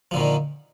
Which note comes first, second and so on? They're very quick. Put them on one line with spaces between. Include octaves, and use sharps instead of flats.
F3 D3 A#2 D#3